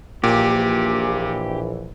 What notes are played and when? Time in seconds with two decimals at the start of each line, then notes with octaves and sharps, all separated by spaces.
0.24 A#1 A#2 E3 G4